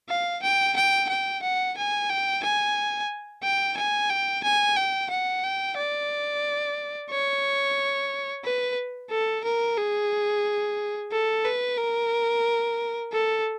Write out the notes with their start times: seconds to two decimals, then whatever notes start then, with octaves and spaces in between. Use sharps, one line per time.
0.09 F5
0.43 G5
0.76 G5
1.09 G5
1.43 F#5
1.77 G#5
2.09 G5
2.43 G#5
3.43 G5
3.77 G#5
4.10 G5
4.43 G#5
4.76 G5
5.10 F#5
5.44 G5
5.77 D5
7.11 C#5
8.44 B4
9.11 A4
9.44 A#4
9.77 G#4
11.12 A4
11.45 B4
11.78 A#4
13.12 A4